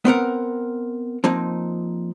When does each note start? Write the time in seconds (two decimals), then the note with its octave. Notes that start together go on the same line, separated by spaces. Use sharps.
0.05 B3 C4 A#4 F#5
1.24 F3 A#3 C4 D#4